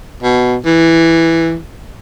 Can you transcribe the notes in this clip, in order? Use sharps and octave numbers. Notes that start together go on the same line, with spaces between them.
B2
E3